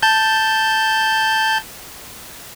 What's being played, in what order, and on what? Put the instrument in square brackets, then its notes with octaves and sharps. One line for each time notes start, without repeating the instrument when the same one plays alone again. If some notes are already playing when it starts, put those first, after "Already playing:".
[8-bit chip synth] A5 G6